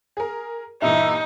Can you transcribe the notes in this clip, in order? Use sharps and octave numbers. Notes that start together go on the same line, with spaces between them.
G#4 A#4
G2 A#2 E3 D#4 E5